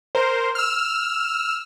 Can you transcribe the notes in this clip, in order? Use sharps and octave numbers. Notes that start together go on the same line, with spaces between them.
A#4 C5
E6 F6